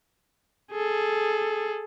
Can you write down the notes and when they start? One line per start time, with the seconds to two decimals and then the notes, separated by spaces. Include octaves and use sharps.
0.71 G#4 A4